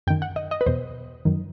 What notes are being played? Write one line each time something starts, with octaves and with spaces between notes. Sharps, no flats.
F#2 D#3 G5
F#5
D#5
D#5
B4
E2 B2 C5
F#2 D#3